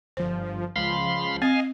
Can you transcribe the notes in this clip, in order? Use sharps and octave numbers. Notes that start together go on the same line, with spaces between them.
G1 F3 C5
C#2 F3 F5 B5 C6
C4 D#5 F5 G#5